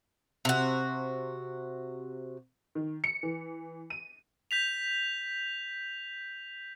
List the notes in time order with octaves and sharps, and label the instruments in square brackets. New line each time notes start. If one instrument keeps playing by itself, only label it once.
[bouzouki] C3 F#4
[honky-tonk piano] D#3
C#7
E3
D#7
[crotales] G6 B6 F7